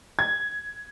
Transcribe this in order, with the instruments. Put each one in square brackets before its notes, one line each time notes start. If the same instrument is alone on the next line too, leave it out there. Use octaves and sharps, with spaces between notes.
[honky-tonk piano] G#6